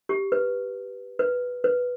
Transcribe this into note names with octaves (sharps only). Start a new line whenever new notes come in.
G4
B4
B4
B4